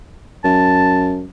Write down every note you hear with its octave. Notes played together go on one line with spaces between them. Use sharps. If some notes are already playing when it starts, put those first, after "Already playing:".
F#2 A5